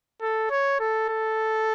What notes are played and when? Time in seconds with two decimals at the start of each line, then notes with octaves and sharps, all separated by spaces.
0.21 A4
0.50 C#5
0.80 A4
1.09 A4